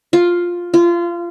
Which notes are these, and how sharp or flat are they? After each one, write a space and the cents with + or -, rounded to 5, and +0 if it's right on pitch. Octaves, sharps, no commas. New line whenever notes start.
F4 +5
F4 -25